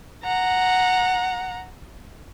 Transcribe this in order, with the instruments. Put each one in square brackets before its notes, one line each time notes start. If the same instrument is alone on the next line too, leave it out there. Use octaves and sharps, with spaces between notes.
[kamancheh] F#5 A#5